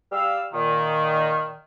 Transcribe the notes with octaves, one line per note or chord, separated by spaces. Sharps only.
G3 G4 F5 E6
A#2 D#3